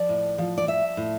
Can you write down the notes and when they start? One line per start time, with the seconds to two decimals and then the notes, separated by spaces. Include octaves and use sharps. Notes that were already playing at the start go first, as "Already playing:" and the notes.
Already playing: F3 D5
0.09 A2
0.38 F3
0.58 D5
0.67 F3 E5
0.97 A2